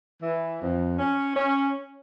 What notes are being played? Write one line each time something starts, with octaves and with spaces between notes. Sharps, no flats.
E3
F2
C#4
C#4